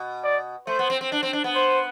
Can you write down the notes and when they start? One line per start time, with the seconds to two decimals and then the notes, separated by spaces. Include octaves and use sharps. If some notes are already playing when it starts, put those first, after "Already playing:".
Already playing: B2
0.24 D5
0.67 A3 C5
0.79 B3
0.90 C4
1.01 C4
1.12 D4
1.23 C4
1.33 D4
1.44 B3
1.55 C5